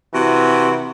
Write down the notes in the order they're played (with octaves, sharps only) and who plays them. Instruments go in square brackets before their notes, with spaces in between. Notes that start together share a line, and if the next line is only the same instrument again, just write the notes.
[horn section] C3 E3 F#4